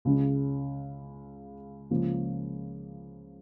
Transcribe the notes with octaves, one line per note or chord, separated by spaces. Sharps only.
C#2 C#3 G#3 C#4
C#2 C#3 F3 A#3